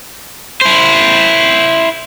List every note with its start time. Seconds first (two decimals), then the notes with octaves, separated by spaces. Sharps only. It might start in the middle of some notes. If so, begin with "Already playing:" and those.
0.61 E4 C5